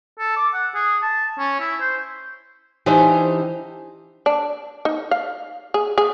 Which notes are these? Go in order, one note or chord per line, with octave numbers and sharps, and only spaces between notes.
A4
D6
F#5
G#4
A5
C#4
E4
C5
E3 D4 D#4 G4 C5
D4
D#4
F5
G#4
G#4